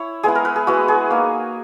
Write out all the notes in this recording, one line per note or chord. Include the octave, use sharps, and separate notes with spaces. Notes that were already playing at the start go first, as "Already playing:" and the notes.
Already playing: E4 C#5
G#3 B3 E4 G#4
A#4
B4
G#4
G#3 B3 E4 F#4
G#4
A#3 D#4